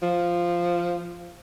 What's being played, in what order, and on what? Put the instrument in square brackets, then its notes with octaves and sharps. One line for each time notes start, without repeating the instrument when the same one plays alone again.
[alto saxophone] F3